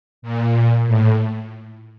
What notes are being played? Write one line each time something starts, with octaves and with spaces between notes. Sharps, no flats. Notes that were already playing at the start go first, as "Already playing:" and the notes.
A#2
A2